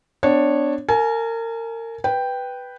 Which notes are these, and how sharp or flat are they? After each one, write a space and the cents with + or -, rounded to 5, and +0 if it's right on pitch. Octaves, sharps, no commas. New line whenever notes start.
B3 +35 D4 +0 C#5 -15
A#4 -30 G#5 +25
B4 +0 G5 +0